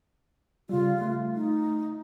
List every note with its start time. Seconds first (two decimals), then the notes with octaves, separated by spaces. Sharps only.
0.69 C#3 G3 F4
1.01 A3
1.35 D#4